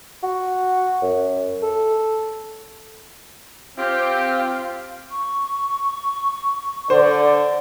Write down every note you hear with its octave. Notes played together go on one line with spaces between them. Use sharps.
F#4
F#2
A4
C4 F4 G4
C#6
D3 C5 D5